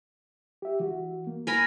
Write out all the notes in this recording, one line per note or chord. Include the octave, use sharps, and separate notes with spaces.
G4 E5
E3 F#4
A#3
A#4 G#5 B5